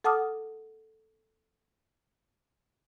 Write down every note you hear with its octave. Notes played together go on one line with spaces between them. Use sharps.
A4 F#5 A5 D6 D#6 F6